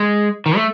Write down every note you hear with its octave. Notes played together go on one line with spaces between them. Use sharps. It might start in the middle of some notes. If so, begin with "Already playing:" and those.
Already playing: G#3
D#3
A3